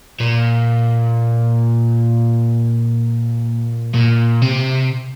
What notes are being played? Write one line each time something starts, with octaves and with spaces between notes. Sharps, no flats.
A#2
A#2
C3